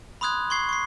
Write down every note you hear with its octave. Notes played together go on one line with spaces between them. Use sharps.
B5 C6 D#6 F#6 G#6
C6 C#6 G#6 C7
C#6 C7